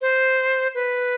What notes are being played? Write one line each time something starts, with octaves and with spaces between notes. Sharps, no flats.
C5
B4